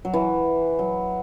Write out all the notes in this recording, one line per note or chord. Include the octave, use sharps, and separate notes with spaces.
F#3
E3
F#3